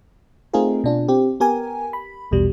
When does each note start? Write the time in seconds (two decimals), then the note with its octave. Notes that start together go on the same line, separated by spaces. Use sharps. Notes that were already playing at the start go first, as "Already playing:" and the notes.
0.54 A3 C4 D#4 F4 G#4 A#4
0.84 B2 D4 F4
1.08 C4 G4
1.40 B3 G4 A#4 G#5
1.93 B5
2.31 A#1 E2 B2 G3